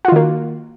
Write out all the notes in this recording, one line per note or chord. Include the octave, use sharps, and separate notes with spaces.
D#3 A#3 F4 F#4